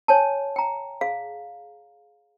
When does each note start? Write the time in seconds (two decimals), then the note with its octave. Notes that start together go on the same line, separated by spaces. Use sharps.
0.08 C#5 G#5 A5
0.56 G5 A#5
1.01 G#4 F5